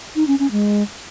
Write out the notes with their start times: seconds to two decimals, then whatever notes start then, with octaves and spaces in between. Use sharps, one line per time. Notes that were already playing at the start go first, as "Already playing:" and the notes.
0.16 D#4
0.27 C#4
0.39 C#4
0.51 G#3